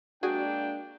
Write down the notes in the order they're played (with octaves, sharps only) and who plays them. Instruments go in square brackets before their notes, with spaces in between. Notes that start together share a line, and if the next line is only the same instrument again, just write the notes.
[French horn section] G#3 A#3 D4 [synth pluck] F#4 G#4 G#5 [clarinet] G5